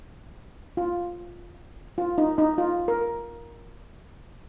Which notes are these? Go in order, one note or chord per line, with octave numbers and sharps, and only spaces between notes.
F4
F4
D#4
D#4
F4
A#4